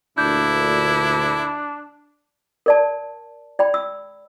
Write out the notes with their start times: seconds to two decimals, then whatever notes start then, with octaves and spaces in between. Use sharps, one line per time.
0.18 D2 A#2 D4 E4 G6
2.66 A#4 D5 A5
3.59 D5 G5 B5
3.74 E6